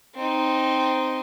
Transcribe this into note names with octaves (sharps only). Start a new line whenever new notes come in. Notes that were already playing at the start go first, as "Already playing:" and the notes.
C4 D#4